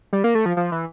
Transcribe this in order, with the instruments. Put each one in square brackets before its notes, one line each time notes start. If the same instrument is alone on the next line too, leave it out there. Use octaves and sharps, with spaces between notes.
[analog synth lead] G3
A#3
A3
F3
F3
E3